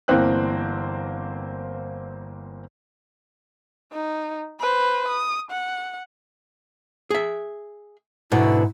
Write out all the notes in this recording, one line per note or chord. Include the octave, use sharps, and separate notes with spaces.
G1 E3 A#3 C4 G5 F#6
D#4
B4 C5
D#6
F#5
G#4 E5
G#2 B2 D3 E4 F#4